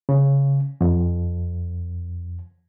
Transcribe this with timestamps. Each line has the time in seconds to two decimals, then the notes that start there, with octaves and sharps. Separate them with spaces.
0.09 C#3
0.81 F2